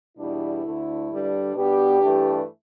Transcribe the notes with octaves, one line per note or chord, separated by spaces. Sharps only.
E2 B2 G3 D4 E4
D2 D3 A3
G2 D3 G3 D4
B2 G3 B3 D4 G4
G2 E3 A3 D4